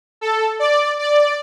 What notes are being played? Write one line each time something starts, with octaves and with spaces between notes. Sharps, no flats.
A4
D5
D5